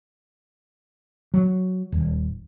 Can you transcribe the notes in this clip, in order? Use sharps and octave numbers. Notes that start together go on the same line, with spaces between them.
F#3
D#1